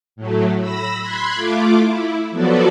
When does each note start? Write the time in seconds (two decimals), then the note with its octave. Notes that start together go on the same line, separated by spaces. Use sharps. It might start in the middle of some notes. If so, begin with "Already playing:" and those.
0.16 A2 F#3 A3
0.59 B5 E6 A#6
0.99 B5 C6 F#6 G#6
1.35 A3 F4 D6
1.74 E4
2.31 F3 F#3 B3 F#4 A4 D5